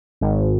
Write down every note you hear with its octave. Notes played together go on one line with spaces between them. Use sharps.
G#1